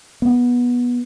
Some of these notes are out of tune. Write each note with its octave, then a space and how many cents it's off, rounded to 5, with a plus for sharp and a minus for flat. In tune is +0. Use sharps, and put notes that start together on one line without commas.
B3 -15